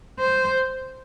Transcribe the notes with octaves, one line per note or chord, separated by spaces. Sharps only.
C5